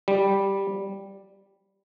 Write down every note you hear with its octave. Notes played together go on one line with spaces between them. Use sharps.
G3